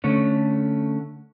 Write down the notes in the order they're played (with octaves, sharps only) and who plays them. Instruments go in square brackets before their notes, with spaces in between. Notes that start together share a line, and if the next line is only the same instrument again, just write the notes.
[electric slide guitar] D3 A3 C#4